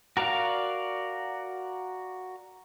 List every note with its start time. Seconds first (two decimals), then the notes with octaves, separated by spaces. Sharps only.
0.17 F#4 A#4 D5 F5